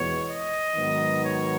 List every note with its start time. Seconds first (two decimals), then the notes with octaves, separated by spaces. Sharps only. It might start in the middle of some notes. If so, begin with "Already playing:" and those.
Already playing: E2 B2 G#3 B3 C#5
0.29 D#5
0.76 G#2 D#3 F#3 B3
1.22 C#5